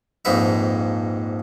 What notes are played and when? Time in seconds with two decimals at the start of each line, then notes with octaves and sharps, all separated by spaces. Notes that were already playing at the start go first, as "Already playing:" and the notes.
0.25 A#1 F2 G#2 D#4 B4 E5